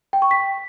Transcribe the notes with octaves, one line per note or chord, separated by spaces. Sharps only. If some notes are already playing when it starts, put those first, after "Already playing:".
G5
C#6
B6